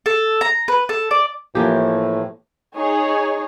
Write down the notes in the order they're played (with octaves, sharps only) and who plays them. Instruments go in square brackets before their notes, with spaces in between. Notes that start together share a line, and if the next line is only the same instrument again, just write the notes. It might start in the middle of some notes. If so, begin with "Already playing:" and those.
[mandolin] A4
A#5
B4
A4
D5
[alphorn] A2 [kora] E3 F3 G4 [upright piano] A#3
[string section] D#4 G#4 C#5